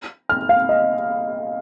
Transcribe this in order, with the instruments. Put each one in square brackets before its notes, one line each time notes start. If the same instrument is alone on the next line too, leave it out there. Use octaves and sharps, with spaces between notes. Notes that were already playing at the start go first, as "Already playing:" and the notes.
[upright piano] F6
F5
D#5